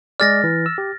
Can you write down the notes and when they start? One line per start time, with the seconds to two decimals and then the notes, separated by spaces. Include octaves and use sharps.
0.20 G#3 G#4 D5 F6 A6 A#6
0.44 E3
0.66 E6
0.78 G4